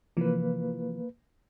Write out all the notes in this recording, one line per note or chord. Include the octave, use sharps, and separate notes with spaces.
C3 E3 F3 A#3 B4